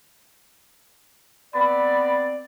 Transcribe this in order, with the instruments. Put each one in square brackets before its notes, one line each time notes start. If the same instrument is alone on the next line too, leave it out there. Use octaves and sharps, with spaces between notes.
[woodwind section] B3 C4 D5 [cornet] B5